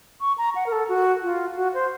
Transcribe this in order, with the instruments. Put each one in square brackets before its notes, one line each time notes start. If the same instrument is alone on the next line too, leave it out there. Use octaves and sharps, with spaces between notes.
[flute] C#6
A#5
F#5
A#4
A4
F#4
F4
F#4
C5